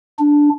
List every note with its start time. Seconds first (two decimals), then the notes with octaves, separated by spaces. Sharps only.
0.19 D4